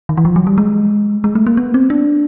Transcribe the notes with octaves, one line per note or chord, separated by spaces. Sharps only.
D#3
E3
F3
F#3
G3
G#3
G#3
A3
A#3
B3
C4
D4